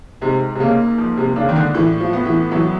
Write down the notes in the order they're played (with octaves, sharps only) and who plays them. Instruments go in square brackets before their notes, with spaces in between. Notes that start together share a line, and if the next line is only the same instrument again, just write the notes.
[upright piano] G#2 [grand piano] C3
[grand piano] C3
[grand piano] C#3 [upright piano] A#3
[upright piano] F3
[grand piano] C3
[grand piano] C#3 [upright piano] D4
[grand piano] D#3
D3
[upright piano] A2 [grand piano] E3
[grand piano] F3
[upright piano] B3
[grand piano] E3
[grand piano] E3 [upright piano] F#3